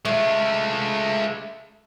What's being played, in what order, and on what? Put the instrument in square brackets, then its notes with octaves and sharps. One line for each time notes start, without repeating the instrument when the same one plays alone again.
[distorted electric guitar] G#3 F4 [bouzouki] A3